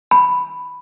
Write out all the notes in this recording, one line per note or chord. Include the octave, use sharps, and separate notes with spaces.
B5